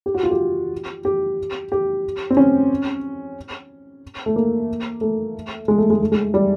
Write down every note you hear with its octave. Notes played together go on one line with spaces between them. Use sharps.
G4
F#4
F4
G4
G4
G4
C4
C#4
A3
A#3
A3
G#3
A3
G#3
A3
G#3
G3